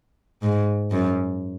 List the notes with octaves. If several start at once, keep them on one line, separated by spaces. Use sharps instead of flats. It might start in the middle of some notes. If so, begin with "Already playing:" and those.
G#2
F#2